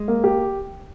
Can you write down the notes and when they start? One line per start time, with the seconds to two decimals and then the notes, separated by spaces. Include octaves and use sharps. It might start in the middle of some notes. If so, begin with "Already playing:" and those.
Already playing: G#3
0.08 A#3
0.24 G4